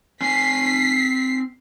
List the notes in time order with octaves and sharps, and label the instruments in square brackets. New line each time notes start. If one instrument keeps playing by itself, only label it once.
[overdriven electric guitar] C4 G#5 [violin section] B6 C7